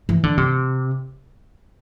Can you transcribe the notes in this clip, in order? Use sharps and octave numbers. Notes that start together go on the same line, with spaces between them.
E3
D3
C3